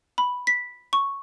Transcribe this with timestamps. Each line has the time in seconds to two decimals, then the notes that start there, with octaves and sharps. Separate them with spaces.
0.18 B5
0.47 B6
0.93 C#6